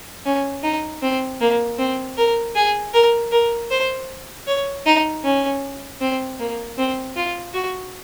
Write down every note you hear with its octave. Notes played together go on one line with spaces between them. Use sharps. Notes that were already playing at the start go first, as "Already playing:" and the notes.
C#4
D#4
C4
A#3
C4
A#4
G#4
A#4
A#4
C5
C#5
D#4
C#4
C4
A#3
C4
F4
F#4